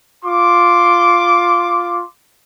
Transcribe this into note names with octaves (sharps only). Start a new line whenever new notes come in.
F4 C6 D6